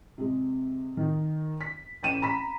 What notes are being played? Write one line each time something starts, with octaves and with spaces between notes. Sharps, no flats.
C3 G#3
D#3 D#4
B6
A1 G5 D#7 E7
A#5 B5 B6